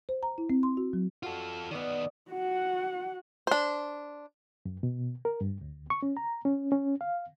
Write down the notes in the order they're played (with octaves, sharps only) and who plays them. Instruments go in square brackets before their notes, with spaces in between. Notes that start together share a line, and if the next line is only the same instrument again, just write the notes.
[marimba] C5
A#5
E4
C4
C6
F#4
F#3
[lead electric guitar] F4 A4 [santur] F#4 F5
[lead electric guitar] D#3 B3 [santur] D5 D#5 F#5
[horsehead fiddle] F#4 F#5
[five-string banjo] D4 C5
[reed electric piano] F#2
B2
A#4
G2
D2
C#6
C#4
A#5
C#4
C#4
F5